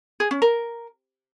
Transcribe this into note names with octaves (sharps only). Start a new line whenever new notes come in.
G#4
C#4
A#4